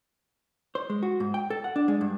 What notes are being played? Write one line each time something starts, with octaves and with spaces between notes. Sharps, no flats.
C5
G#3
F#4
G#2
G5
A4
F#5
D4
G#3
G2